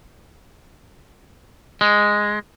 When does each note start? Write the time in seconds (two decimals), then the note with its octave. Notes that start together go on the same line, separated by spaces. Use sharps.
1.81 G#3